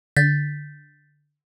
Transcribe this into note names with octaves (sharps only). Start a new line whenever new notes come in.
D3 G6 A6 B6